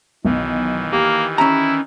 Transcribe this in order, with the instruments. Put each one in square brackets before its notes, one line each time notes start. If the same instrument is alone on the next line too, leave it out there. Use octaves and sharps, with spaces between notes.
[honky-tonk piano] B1 [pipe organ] D#3 E3
[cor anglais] A#3 [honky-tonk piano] G4
[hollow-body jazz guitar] C#4 A#5 [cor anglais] E4